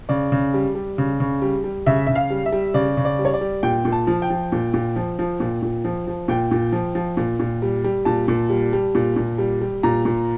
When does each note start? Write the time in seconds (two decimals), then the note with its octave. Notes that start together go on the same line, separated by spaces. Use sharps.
0.09 C#3 D5
0.32 C#3
0.54 G3
0.75 G3
0.98 C#3
1.20 C#3
1.42 G3
1.64 G3
1.86 C#3 E5
2.07 C#3 E5
2.15 F5
2.30 G3
2.46 E5
2.52 G3
2.74 C#3 D5
2.97 C#3
3.05 D5
3.19 G3
3.25 C#5
3.34 D5
3.41 G3
3.63 A#2 G5
3.85 A#2
3.92 A5
4.07 F3
4.22 G5
4.30 F3
4.52 A#2
4.74 A#2
4.96 F3
5.19 F3
5.40 A#2
5.62 A#2
5.85 F3
6.07 F3
6.28 A#2 G5
6.51 A#2
6.72 F3
6.95 F3
7.17 A#2
7.39 A#2
7.62 G3
7.84 G3
8.05 A#2 A5
8.28 A#2
8.50 G3
8.73 G3
8.95 A#2
9.16 A#2
9.38 G3
9.61 G3
9.83 A#2 A#5
10.05 A#2